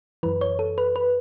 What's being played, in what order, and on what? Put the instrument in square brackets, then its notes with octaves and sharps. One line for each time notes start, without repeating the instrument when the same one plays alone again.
[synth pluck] F#2 E3 B4
C#5
A4
B4
B4